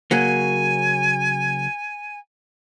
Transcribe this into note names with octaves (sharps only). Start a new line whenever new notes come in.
C#3 F#3 A#3 G#5